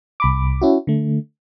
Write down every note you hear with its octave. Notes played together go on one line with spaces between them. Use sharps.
C2 B5 D6
C#4 E4 F#4
D3 A3